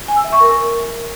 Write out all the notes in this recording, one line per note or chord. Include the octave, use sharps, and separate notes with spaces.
G#5
E6
E5
C#6
A#4